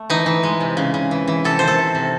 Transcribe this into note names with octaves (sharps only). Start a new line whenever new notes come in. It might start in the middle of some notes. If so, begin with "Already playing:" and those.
Already playing: A3
E3 D#4
E3
G#3
C3
C#3
C#3
E3
E3
C3 A4
D#3 C5
A4
C3
C3